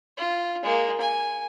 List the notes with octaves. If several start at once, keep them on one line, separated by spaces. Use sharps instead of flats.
F4
G#3 A#3
G#5